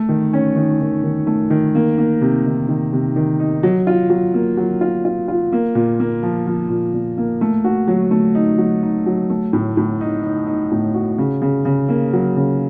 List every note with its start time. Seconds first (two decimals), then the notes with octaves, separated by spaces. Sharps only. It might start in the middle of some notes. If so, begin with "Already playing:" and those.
Already playing: A3
0.09 D#3
0.33 C#4
0.56 D#3
0.81 D#3
1.04 D#3
1.27 A3
1.50 D#3
1.75 A#3
1.98 A#3
2.21 C3
2.45 D#3
2.68 D#3
2.93 C3
3.16 D#3
3.40 D#4
3.63 F#3
3.87 F4
4.10 F#3
4.34 A#3
4.57 F#3
4.81 F4
5.05 F4
5.28 F4
5.52 A#3
5.75 A#2
6.00 A#3
6.23 F3
6.47 F3
6.69 A#2
6.94 A#2
7.18 A#3
7.41 A3
7.64 F#4
7.88 F#3
8.11 A3
8.35 D#4
8.58 F#3
8.83 D#4
9.06 F#3
9.30 A3
9.53 A2
9.77 A2
10.01 D#4
10.24 D#4
10.47 D#4
10.72 A2
10.94 F#4
11.18 C#3
11.42 C#3
11.65 C#3
11.89 A#3
12.13 F#3
12.37 C#3